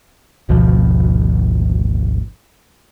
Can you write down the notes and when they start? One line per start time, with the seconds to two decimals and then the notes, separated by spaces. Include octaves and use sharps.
0.49 G#1 D2 B2 F3